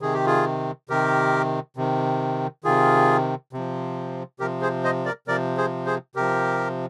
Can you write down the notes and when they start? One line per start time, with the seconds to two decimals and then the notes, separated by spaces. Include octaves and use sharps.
0.01 C3 D#3 G#4
0.14 G4
0.26 F4 G#4
0.89 C3 D#3 G4 A#4
1.77 C3 D#3
2.64 C3 D#3 F4 G#4
3.53 C3 F3
4.40 C3 F3 G4 A#4
4.61 G#4 C5
4.84 C5 D#5
5.05 A#4 D5
5.27 C3 F3 A#4 D5
5.57 G#4 C5
5.86 G#4 C5
6.15 C3 F3 G4 A#4